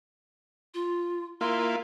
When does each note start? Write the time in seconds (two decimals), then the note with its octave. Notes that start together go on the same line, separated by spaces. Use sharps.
0.74 F4
1.41 A#3 E4 F4 C6